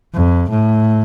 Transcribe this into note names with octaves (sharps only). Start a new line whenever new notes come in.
F2
A2